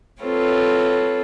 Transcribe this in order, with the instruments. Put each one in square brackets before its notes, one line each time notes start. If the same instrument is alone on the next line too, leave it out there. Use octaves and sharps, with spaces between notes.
[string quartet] C4 F4 A4 B4 C#5